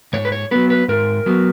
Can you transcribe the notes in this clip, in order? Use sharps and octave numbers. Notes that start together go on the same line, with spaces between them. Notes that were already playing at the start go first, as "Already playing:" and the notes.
G#2 C#5
B4
C#5
F#3 B3 B4
B4
G#2 A#4
F#3 B3